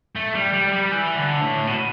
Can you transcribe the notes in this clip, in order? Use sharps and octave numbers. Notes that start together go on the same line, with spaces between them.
A3
G3
G3
G3
E3
D3
A2
B2